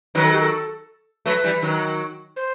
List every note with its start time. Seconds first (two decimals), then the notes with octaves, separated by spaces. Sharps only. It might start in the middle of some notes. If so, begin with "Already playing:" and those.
0.15 D#3 F#3 B4
0.24 A4
0.33 G4
0.41 A4
1.26 F#3 A3 B4
1.44 E3 G3
1.62 D#3 F#3
2.36 C5